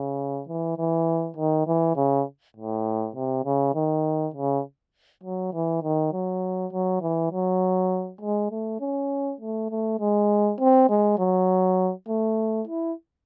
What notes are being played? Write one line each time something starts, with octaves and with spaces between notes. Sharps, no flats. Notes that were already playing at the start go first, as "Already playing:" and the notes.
Already playing: C#3
E3
E3
D#3
E3
C#3
A2
C3
C#3
D#3
C#3
F#3
E3
D#3
F#3
F#3
E3
F#3
G#3
A3
C#4
A3
A3
G#3
C4
G#3
F#3
A3
E4